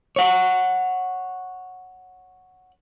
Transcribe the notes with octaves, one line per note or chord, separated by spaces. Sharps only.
C#5 F#5